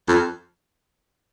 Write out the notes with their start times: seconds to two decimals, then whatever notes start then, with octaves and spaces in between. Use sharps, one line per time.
0.08 F2